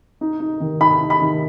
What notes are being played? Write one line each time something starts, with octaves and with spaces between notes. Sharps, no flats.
D#4
D#4
D#3
D#4 B5
D#4
B5
D#3